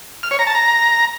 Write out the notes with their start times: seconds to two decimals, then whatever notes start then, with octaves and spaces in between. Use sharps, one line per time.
0.23 F6
0.31 C#5
0.39 A#5
0.47 A5
0.55 A#5